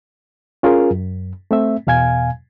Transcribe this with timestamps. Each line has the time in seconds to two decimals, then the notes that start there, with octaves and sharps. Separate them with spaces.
0.63 C#4 F4 G#4 A#4
0.91 F#2
1.51 A3 C4 E5
1.87 E2 B2 F5 G#5 G#6